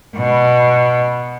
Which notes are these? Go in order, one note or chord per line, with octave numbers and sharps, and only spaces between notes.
B2